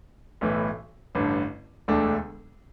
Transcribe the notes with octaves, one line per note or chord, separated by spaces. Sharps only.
B1 A2 E3
A1 G2 D3
E1 D2 D3 A3 D4